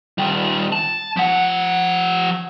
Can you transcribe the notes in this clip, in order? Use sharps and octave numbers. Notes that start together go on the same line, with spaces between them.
D#3 G3
A5
F3 F#5